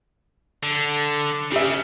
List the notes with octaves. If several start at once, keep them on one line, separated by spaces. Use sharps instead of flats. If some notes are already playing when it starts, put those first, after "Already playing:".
D3
C#3 G4 E5